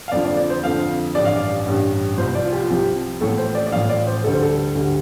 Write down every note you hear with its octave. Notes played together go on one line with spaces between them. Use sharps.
F5
F2 D3 F3 D5
D5
D5
C5
F2 D3 F3 F5
A1 G2 G3 D5
F5
D5
A1 G2 G3
C2 C3 F3 C5
D5
F4
G4
F4
C2 C3 F3 G4
A1 A2 F3 A4
C5
D5
D5
A1 A2 F3 F5
D5
C5
D2 D3 G3 A4
C5
A4
D2 D3 G3